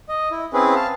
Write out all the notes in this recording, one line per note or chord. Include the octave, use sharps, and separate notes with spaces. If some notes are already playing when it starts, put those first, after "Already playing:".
D#5
E4
C4 C#4 E4 G#4 B4
F5 A5